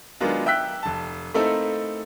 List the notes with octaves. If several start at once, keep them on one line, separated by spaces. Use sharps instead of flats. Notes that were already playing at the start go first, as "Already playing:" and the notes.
D#3 F#3 G#3 B3 D4 F4
E5 G5 E6 F#6 B6
F1 A5
A3 A#3 C4 D#4 E4 A4